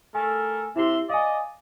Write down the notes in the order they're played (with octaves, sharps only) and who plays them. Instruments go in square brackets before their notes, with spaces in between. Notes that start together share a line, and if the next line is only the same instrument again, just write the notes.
[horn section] A3 A4 A#4 [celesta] G#5
[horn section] C3 E5 C6 [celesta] E4 G4
[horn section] D5 D#5 [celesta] F5 G#5